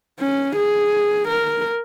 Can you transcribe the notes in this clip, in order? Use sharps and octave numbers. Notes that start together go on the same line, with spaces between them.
C#4
G#4
A#4